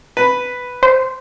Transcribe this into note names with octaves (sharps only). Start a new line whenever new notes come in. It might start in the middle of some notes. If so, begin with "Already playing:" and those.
B4
C5